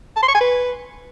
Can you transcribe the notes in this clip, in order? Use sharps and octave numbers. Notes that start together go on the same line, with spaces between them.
A5
C6
C#6
G#5
B4